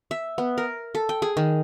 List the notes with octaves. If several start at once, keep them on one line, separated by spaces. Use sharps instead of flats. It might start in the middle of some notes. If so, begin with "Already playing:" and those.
E5
B3
A#4
A4
G5
G#4
D#3